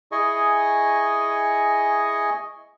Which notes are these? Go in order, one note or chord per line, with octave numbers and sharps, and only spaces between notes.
E4 G#4 D#5 G#5 C#6